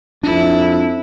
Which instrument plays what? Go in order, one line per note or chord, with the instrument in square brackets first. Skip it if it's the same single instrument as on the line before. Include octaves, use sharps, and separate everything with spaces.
[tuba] F2 [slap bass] D4 [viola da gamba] E4